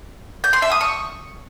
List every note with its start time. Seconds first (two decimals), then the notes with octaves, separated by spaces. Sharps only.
0.44 G6
0.53 C6
0.62 E5
0.71 D#6
0.81 C#6